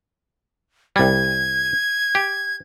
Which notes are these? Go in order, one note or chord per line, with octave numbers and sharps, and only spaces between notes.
C2 G3 G#6
G4